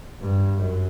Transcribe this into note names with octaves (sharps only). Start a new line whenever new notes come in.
G2
F#2